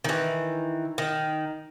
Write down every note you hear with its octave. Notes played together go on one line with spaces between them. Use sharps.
D#3 E3
D#3